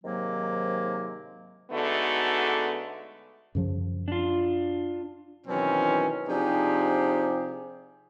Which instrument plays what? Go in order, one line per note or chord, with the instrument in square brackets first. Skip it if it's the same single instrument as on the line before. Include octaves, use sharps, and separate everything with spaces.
[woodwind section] G#2 C3 D#3 F#3 A#3
[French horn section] D3 G#3 A3 B3 D#4 F#4
[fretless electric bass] F#2 C#3 F3
[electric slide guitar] D4 F4
[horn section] B2 D#3 E3 F#3 C4 C#4
C3 F3 D4 D#4 G4 G#4